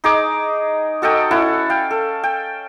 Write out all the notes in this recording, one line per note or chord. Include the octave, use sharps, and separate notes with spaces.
D#4 G#4 D6
F#4 A4 D#5 G5
C#4 E4 A4 F#5
F5 G5
A4
G5